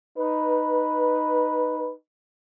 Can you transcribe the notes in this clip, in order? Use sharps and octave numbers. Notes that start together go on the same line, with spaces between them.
D#4 B4